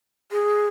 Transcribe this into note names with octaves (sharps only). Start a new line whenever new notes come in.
G#4